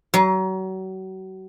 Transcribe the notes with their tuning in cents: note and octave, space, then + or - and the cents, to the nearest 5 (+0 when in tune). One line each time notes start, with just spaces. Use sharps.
F#3 +35